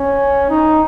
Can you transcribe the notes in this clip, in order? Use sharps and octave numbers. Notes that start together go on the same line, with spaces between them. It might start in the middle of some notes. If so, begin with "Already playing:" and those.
Already playing: C#4
D#4